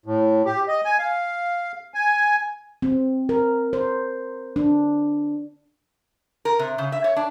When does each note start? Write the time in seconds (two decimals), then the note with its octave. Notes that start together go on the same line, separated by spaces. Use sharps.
0.06 A2
0.45 G4
0.68 D#5
0.85 G#5
0.99 F5
1.94 G#5
2.82 C4
3.29 A#4
3.73 C5
4.56 D4
6.45 A#4
6.59 C3
6.78 C#3
6.92 E5
7.04 C#5
7.16 D4